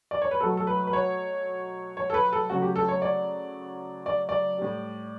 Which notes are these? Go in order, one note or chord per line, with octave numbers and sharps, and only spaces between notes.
D5
C#5
B4
B2 F#3 A3 A4
A4
B4
B4
C#5
C#5
A4
B4
A4
C#3 F#3 A3 F#4
G4
A4
C#5
D5
D5
D5
A2 G3